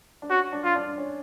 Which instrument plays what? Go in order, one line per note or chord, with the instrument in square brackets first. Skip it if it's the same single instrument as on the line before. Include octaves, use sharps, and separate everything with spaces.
[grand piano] D4
[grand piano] C#4 [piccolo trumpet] F#4
[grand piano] D4
[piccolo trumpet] F4
[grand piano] D4
C#4